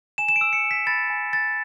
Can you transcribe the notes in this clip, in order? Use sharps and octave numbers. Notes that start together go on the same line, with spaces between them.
G#5 E7
E7
D7
E6
C#7
G#5
B6
B5 A6
G#5
E6 A6